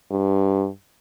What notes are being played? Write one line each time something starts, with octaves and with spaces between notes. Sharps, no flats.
G2